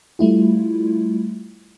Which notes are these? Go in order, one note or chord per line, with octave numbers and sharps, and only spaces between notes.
G3 A3 E4 F4